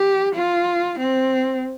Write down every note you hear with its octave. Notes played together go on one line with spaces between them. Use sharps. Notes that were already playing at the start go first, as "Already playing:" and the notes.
Already playing: G4
F4
C4